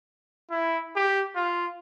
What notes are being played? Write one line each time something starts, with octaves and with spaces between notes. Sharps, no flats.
E4
G4
F4